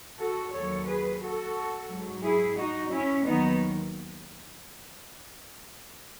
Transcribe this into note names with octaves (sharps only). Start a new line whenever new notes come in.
F#4 A4
D#2 D#3 F#3 A4 C#5
G#4 B4
F#4 A4
G#2 F#3
E4 G#4
D#4 F#4
C#4 E4
D#2 D#3 F#3 B3 D#4